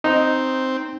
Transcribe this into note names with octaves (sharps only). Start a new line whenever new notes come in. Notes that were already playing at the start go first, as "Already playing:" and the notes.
C4 D#4 D#5